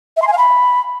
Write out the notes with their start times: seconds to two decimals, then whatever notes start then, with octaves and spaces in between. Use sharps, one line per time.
0.17 E5
0.22 C6
0.27 G#5
0.33 F5
0.38 B5